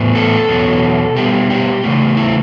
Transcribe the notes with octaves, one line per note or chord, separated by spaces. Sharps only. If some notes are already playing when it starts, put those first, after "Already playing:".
Already playing: A2 E3 B3
A4
E2 B2 F#3
B2 G3 B3 G4
G4
C#3 E3 A3
E4